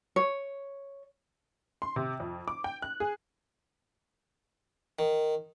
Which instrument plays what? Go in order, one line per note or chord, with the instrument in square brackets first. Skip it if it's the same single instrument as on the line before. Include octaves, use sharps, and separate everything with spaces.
[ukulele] C#5
[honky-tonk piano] C6
C3
F2
D6
G5
F#6
G#4
[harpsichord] D#3